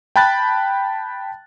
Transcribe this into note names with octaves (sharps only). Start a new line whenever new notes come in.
G5 A5 B5 F#6 A6